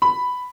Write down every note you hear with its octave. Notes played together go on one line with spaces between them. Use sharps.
B5